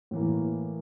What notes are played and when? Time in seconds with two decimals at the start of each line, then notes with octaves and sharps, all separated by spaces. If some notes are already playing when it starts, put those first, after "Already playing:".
0.11 A2 E3 A#3